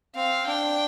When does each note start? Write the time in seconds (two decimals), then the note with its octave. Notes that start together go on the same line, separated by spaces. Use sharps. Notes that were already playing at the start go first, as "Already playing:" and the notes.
0.16 C4 F5
0.47 D4 G5